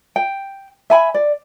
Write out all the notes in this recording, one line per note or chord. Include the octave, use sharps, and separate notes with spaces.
G5
E5 G#5 B5
D5